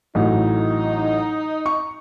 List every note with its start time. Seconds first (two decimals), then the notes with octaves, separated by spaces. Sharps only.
0.15 A1 A2 F#3 D#4
1.66 C#6